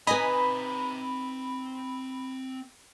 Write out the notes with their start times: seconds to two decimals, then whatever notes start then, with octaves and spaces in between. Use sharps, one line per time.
0.07 C4 D#4 B4 D#5 G#5 A#5 B5 D#6